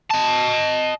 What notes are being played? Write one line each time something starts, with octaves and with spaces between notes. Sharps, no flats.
D#5 A5